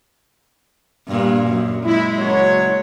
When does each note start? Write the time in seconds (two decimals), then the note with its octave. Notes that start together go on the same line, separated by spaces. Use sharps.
1.08 G2 A#2
1.47 F#2
1.85 G#3 E4
2.19 F#1 F#3 C#5